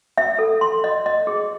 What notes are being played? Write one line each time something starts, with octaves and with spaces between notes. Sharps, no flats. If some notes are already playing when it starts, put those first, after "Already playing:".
E5
A4
C6
D#5
D#5
G#4